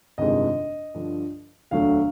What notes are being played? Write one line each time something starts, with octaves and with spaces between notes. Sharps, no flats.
G1 F2 C3 D#3 G#3 D#5
G2 D3 F3
E1 D2 D3 F#3 A3 F5